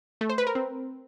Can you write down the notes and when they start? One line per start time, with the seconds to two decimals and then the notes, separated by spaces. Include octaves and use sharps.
0.21 A3
0.30 C5
0.38 B4
0.47 A#4
0.55 C4